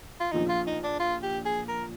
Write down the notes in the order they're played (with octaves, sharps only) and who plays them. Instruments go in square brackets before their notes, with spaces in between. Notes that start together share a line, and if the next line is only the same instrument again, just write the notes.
[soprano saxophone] F4
[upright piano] A#1 A#2 F3 [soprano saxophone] D#4
[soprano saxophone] F4
D#4
D4
F4
G4
G#4
A#4